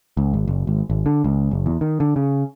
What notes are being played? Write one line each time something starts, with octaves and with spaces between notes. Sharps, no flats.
C#2
G#1
F#1
G#1
G#1
D3
C#2
F#1
E2
D#3
D3
C#3